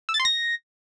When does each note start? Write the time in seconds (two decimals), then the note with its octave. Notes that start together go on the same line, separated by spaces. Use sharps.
0.09 E6
0.14 A6
0.20 C6
0.25 A#6